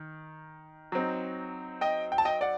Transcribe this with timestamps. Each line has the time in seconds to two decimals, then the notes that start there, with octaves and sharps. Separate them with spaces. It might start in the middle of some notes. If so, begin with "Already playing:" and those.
Already playing: D#3
0.92 F#3 C4 D#4
1.81 D#5 G5
2.12 G5
2.18 A5
2.25 D#5 G5
2.41 D5 F#5